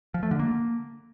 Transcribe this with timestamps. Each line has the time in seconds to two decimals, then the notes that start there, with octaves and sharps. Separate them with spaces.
0.14 F3
0.23 A3
0.31 D3
0.40 A#3